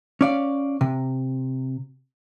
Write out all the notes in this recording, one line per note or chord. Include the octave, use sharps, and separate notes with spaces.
C#4 D5 F5
C3